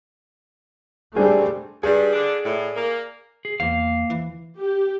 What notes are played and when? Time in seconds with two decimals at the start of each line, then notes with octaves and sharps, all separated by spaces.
1.16 G3 A3 C4 D4 G#4
1.83 G2 G#4 D5
2.13 D3 D4
2.45 A2
2.76 A#3
3.45 G#4
3.60 E2 A#3 C5 F5
4.10 E3
4.58 G4